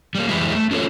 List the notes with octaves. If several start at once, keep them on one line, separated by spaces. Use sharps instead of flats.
G3 A#3
E3 G3 G#3 E4
A3
C#4 D4 F4 F#4 A4 C#5